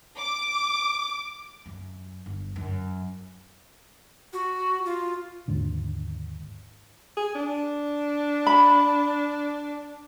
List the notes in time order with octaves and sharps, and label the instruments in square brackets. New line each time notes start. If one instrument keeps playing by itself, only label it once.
[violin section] D6
[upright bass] F#2
G1
F#2
[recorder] F#4
F4
[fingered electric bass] G#1 D#2 G#2 D3
[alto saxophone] G#4
D4
[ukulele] B5